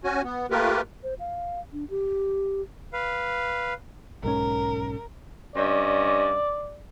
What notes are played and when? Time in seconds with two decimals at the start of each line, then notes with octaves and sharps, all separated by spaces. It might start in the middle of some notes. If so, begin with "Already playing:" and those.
0.04 C#4 F#4 G#5
0.24 B3
0.51 A3 A#3 F4 G4 A#4 B4
1.03 C5
1.20 F5
1.73 D4
1.90 G4
2.93 B4 F5
4.23 B1 G#2 C#4 A#4
5.55 G2 C#4 D5 D#5